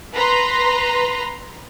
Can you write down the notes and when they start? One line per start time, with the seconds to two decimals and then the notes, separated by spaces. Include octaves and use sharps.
0.14 B4 A#5 C6